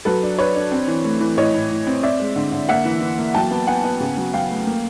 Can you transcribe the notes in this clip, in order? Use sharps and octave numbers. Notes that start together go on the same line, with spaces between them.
F#3 A4 B4
D4
D4 B4 C#5
D4
C4
E3
A3
E3
A2 C#5 D#5
A2
A2
C4
C4 D5 E5
G#3
D3
D3
A#3 E5 F#5
E3
E3
A#3
F#3 G5 A5
B3
B3 F#5 G#5
B3
C#3
F#3
F#3 F5 G5
A3
A#3